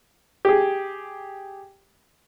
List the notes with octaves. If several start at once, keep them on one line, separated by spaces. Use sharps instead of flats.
G4 G#4